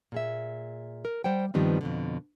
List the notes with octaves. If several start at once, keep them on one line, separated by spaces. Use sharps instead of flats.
A#2 G#4 E5
A#4
G3 C5 F#5 G5
G2 D#3 F3 G3 B3 C4
F2 B2 D3